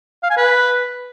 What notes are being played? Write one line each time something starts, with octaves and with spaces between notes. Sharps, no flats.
F5
G#5
B4